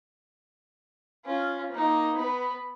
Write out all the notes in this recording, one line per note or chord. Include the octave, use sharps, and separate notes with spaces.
C#4 F4
A#3 D#4
B3 B4